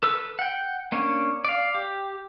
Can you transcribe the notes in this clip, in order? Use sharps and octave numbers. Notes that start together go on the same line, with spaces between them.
A4 B4 E6
F#5 G5
A#3 C#4 D4 C#5
D5 F5
G4